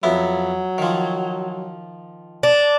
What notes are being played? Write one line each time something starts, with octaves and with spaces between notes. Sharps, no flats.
F2 F#3 B3 E4
D#3 F3
D4